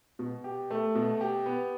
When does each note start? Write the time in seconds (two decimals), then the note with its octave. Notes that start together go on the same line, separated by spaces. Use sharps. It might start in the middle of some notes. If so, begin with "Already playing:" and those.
0.19 B2
0.44 G4
0.70 A3
0.95 B2
1.21 G4
1.46 B3